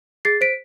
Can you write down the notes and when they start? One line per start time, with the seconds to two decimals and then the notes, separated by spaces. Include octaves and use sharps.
0.25 G#4 A6 C7
0.41 C5 B6 D7